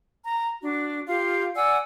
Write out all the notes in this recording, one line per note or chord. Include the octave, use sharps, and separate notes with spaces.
A#5
D4 F#4
F4 G4 F5
D5 F#5 G#5 E6